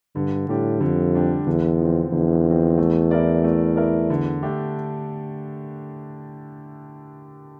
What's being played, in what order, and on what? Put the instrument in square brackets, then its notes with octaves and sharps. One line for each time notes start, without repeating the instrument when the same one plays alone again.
[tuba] G2 [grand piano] D3
[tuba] A2 [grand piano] G3 D4 G4
[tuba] F2 [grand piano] D3
[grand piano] G3 D4 G4
[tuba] E2 [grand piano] D3
[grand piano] F3 C4
[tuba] E2 [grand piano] D3
[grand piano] F3
C4
A3
E4 A#4 D5
A3
E4 A#4 D5
D3
A3 D4 G4